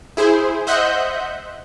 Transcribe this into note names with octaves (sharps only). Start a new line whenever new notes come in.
E4 G#4 C5
C5 D#5 E5 F#5 F#6 G6